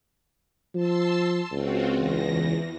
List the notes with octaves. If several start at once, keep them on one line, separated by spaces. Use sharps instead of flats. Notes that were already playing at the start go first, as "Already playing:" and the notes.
F3 A5 C6 E6
C#2 C4 F4 F#4
E2 E3 A#6